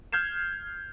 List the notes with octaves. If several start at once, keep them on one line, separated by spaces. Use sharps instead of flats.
F6 G6 G#6 C7 E7